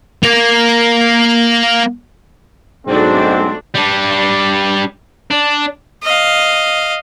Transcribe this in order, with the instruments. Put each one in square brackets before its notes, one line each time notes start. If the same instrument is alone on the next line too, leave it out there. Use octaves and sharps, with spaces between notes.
[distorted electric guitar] A#3 A#4
[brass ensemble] B1 G#2 C4 [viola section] A3 D4 F#4
[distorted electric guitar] G3 D4
D4
[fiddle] D#5 F5